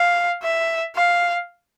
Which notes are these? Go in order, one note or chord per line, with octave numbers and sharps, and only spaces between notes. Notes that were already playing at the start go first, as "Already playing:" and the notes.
Already playing: F5
E5
F5